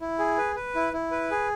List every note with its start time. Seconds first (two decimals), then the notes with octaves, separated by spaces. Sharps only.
0.01 E4
0.19 G#4
0.37 B4
0.56 B4
0.75 E4
0.93 E4
1.11 B4
1.31 G#4